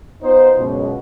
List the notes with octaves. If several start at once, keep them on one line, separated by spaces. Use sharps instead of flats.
B3 D#4 F4 C5
C#2 F#2 B2